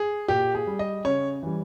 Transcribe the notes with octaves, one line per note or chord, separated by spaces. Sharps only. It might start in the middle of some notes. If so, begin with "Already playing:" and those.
Already playing: G#4
A#2 G4
G#4
G3
D#5
C#3 C#5
E3 G3